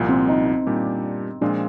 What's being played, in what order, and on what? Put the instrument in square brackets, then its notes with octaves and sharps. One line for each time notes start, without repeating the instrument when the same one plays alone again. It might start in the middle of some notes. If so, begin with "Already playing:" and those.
Already playing: [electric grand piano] C2 A#2 F3
[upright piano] C4
D#4
D#4
[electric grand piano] A#2 G3 D4 G4
[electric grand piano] A#2 F3 G#3 C4 F4 [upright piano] D4